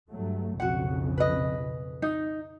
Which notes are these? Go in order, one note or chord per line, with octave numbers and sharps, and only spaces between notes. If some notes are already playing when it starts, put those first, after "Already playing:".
G2 F#3 A3
B1 F2 C#3 F#4 F#5
B4 D#5
D#4